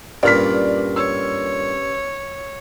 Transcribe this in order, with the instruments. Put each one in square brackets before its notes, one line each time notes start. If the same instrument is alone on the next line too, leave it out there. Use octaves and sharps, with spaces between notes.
[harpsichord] G2 A#2 [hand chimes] C#4 G4 B4 [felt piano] D5 F6 B6
[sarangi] C#5 [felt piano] E6